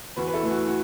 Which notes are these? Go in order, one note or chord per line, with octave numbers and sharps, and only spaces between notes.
E2 F#4 B4
B4
E4 A4
E3 A3
F#4
F#4